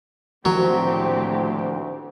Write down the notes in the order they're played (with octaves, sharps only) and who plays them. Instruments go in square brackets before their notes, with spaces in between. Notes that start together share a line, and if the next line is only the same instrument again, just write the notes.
[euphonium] D2 [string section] A2 C4 G4 [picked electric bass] D#3 F3 A#3 [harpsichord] F#3